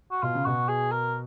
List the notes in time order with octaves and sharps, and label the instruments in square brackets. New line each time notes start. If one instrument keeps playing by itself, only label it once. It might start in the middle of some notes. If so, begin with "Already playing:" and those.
[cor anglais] F#4
[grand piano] B2 [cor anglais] F4
[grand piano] C#3
[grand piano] B2 [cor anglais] F#4
[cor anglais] G#4
A#4